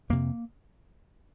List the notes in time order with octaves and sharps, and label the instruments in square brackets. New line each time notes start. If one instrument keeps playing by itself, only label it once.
[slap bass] F2 C3 A#3